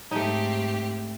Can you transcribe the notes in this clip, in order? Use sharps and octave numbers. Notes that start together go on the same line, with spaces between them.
G#2 A3 C4 D#4 G4